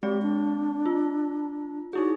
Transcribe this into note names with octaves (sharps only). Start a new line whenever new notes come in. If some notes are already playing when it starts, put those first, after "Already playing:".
G#3 C4 G4 D5
D4
F4
D#4 E4 F#4 G#4